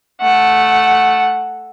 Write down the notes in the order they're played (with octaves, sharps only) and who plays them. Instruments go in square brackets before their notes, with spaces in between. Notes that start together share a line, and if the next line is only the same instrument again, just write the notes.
[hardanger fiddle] A3 F#5